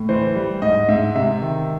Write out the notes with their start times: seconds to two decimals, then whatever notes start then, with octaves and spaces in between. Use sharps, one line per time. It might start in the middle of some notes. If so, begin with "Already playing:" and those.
Already playing: A2
0.09 E3 C5
0.35 G3
0.62 G#2 D#5
0.89 G#2 E5
1.15 C3 E5
1.42 D#3